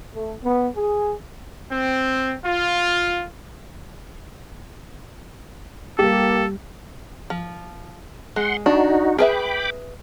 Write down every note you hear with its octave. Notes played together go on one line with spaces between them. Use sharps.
A3
B3
G#4
C4
F4
G3 A#3 G4 A4
F3
G#3 F#5 C6
D4 D#4 F#4
G#4 B4 E5 G5 B5 D6